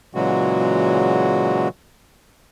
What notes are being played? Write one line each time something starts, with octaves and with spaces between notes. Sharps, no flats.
A#2 C#3 E3 F#3 G#3 F#4